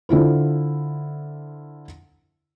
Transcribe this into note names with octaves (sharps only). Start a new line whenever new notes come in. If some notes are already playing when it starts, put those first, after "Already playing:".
D3 E4 F4 C5